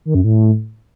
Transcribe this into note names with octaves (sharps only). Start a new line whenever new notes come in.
D#3
F#2
A2